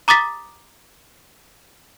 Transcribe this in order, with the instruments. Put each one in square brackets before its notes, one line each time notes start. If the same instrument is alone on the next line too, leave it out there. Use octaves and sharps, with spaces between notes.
[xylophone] A#5 D6 D#6 A6 B6